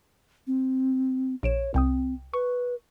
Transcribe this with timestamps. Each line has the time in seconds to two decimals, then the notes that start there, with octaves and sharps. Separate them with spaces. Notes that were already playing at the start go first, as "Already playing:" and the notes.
0.47 C4
1.43 A#1 C#5 D7 E7
1.74 C2 C4 G5 D#6
2.34 B4 C#6